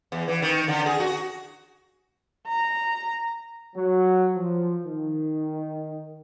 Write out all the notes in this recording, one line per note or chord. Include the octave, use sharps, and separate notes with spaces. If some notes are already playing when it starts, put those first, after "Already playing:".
E2
E3
D#3
D3
G#4
F#4
A#5
F#3
F3
D#3